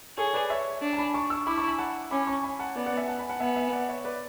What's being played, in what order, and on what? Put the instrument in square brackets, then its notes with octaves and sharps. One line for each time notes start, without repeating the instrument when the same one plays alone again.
[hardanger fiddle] G#4 [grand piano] A4 C#5
[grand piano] B4 D5
C#5 E5
[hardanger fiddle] D4
[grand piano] A5
G#5 B5
A5 C#6
C#6 E6
[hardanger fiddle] E4 [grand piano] B5 D6
[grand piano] A5 C#6
G#5 B5
F#5 A5
[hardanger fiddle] C#4 [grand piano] B5 D6
[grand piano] A5 C#6
G#5 B5
F#5 A5
[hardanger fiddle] B3 [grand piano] D5 F#5
[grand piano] D5 F#5
E5 G#5
F#5 A5
G#5 B5
F#5 A5
[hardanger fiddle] B3 [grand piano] E5 G#5
[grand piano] E5 G#5
D5 F#5
C#5 E5
B4 D5